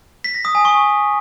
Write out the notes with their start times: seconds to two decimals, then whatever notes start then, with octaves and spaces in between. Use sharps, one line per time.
0.24 B6
0.35 A#6
0.45 D#6
0.55 G#5
0.65 C#6